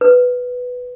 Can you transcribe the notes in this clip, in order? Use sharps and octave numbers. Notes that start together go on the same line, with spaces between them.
B4